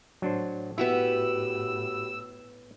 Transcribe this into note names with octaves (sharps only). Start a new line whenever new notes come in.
A2 F#3 D4 C5
B3 E4 F#4 G4 B4 E6